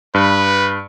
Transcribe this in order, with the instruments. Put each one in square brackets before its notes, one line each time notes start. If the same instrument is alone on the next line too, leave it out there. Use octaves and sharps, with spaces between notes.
[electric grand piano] G2 [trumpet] B4